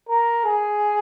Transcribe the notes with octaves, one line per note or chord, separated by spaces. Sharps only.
A#4
G#4